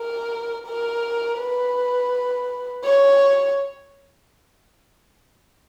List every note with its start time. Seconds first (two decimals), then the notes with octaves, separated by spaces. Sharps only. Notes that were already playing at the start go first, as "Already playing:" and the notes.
Already playing: A#4
0.67 A#4
1.39 B4
2.84 C#5